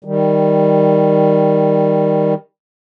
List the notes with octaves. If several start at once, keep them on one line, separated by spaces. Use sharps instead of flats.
D#3 G3